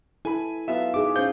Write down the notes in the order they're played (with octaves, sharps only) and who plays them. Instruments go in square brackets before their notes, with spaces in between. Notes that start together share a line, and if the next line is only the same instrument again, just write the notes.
[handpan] E4 A4 [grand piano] G#5 B5
[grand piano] F#3 B3 F4 [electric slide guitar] E5
[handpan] D#4 G#4 [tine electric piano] D6
[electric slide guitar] C#4 C5 [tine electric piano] F5 G6